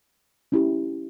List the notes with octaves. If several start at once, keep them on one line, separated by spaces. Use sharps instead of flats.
C#4 E4 G4